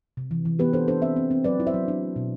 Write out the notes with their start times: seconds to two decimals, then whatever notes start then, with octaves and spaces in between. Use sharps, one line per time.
0.17 C3
0.31 E3
0.45 E3
0.59 B3 G4 B4
0.73 D4 A4 C5
0.88 D4 A4 C5
1.02 C4 C5 E5
1.16 C4
1.31 C4
1.44 F#3 B4 D5
1.60 E4
1.67 C5 E5
1.74 F#3
1.88 D4
2.02 A3
2.16 B2